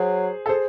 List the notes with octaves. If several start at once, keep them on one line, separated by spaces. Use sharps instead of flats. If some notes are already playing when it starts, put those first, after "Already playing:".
Already playing: F#3 G#4 C5
A4
G#4 C5